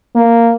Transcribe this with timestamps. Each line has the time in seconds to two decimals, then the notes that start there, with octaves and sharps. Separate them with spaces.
0.15 A#3